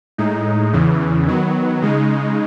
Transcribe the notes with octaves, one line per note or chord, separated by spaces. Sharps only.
A2 G#3 D#4
E2 C#3 E3
D#3 F#3 B3
C#3 G#3 D#4